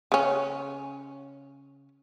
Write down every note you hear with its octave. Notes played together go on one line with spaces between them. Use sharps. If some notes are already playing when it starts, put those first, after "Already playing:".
C#3 C#4